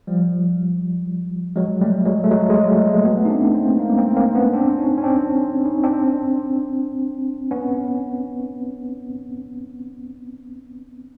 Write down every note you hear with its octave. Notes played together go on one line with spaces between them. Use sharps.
F3 G3
F#3 G#3
G3 A3
F#3 G#3
A3
F#3 G#3
F#3 G#3
G3 A3
G#3 A#3
A3 B3
D#4
C4 D4
A#3 C4
G#3 A#3
A#3 C4
A#3 C4
B3 C#4
C4 D4
C#4 D#4
C#4
C4 D4
C#4 D#4
C4 D4
B3 C#4